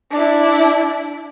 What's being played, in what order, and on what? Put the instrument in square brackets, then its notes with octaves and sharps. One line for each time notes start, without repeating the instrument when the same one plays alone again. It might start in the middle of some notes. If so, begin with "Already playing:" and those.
[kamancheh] D4 E4